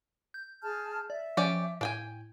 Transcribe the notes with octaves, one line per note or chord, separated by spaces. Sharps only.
G6
G#4 A5 F6
D5 E5
F3 C#4 G4 D5
A2 D4 G5 G#5